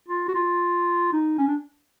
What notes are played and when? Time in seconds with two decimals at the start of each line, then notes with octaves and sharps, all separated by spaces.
0.08 F4
0.28 F#4
0.34 F4
1.13 D#4
1.38 C#4
1.48 D4